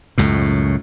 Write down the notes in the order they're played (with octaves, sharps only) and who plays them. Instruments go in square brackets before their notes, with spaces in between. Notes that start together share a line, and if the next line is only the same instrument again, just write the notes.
[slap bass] C#2 F#2 A2